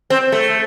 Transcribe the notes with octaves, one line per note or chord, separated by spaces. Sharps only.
C4
A3